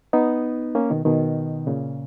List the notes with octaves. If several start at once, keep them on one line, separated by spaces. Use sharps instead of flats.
B3 D#4
A#3 C#4
B2 D#3
B2 D#3
A#2 C#3